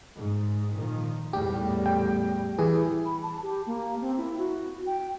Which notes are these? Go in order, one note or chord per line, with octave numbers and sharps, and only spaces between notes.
G#2
A#2 D#3 F3
E2 A2 G3 G4
G5
E3 G#4
B5
A5
G4
A#3
C4
E4
F#4
G5